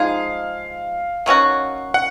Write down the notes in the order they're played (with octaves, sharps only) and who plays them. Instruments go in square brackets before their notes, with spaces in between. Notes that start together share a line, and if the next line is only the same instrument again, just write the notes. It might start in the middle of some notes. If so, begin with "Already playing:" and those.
Already playing: [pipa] F3 G#3 D#4 G#4 [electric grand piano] F5
[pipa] D#3 F#3 C#4 F#4
[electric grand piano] F#5